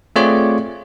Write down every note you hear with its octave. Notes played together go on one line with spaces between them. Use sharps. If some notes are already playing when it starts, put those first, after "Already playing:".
A3 C4 F4 G#4 C#5 D5